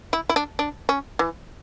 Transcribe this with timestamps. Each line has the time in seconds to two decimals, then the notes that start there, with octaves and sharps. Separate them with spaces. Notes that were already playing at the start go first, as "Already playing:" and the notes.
0.13 E4
0.29 E4
0.36 D4
0.59 D4
0.89 C#4
1.19 E3